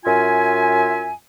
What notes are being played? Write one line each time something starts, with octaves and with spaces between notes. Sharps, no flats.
F#2 F4 E5 G#5